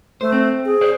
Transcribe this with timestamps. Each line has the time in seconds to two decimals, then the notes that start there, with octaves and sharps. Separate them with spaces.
0.21 A3 C5
0.32 C4
0.65 G#4
0.81 B4 C5 D5